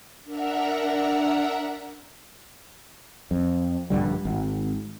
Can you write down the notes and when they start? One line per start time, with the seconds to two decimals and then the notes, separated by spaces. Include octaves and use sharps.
0.24 D4 A#4 E5 F#5 A#5
3.31 F2
3.90 A#1 G2 D3 G3
4.25 G#1